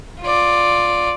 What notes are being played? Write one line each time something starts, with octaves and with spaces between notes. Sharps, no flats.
F4 D5